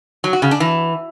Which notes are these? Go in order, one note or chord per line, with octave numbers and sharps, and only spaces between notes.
F#3
F#4
C#3
D4
E3